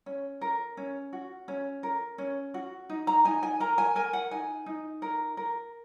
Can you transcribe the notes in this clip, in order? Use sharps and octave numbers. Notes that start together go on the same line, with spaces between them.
C#4
A#4
C#4
F#4
C#4
A#4
C#4
F#4
D#4
A#5
D#4 G#5
G#5
A#4 A#5
G#5
A#4 G#5
F#5
D#4 G#5
D#4
A#4
A#4